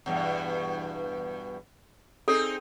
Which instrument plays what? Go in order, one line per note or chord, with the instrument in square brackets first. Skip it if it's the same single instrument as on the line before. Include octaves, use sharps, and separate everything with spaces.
[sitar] E2 G2 B2
[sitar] C4 D#4 G#4 [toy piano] A4